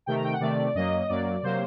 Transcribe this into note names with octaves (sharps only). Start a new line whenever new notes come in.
C3 D#3 A3 G5
A#5
G5
F#5
C3 D#3 A3 D5
F#2 F#3 A#3 D#5
F#2 F#3 A#3 D5
C3 F#3 A#3 C5